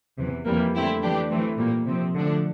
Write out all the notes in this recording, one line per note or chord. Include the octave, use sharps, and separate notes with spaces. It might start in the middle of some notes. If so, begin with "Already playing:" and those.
E2 C3 E3
F2 C3 E3 G3 A#3
D3 A3 C4 E4 G4
E3 A3 D4 G4
E3 A3 C4
A#2 G3 A#3
C3 F3 C4
D3 F3 A3 D4